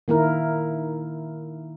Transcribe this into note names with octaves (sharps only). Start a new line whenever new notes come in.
D#3 A#3 E4 A#4